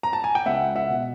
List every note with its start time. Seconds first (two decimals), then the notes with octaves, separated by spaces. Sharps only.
0.03 A#5
0.13 A5
0.24 G#5
0.35 G5
0.46 C#2 E5 F#5
0.76 E5 F#5
0.89 B2